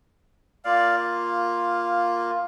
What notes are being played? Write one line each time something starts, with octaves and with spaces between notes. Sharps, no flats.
A#3 F4 D5 F5